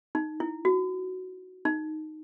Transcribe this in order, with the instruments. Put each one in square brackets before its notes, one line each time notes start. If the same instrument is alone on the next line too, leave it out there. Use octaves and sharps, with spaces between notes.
[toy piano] D#4
E4
F#4
D#4